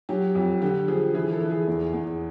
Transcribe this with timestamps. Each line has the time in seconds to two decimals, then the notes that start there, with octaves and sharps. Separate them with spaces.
0.09 F#3 G4
0.35 F2
0.61 D3 G4
0.88 F3 G#4
1.14 E3 G#4
1.32 A4
1.41 E3
1.50 G#4
1.67 E2
1.93 E2